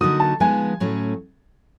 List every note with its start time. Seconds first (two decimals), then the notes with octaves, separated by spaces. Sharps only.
0.01 D3 F#3 A#3 D#4 F#4 D#6
0.20 A5
0.40 F3 G#3 B3 D#4 G#5
0.80 A2 F#3 A3 C#4